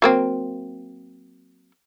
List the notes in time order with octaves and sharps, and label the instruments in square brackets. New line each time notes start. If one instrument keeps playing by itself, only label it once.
[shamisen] F#3 A#3 C4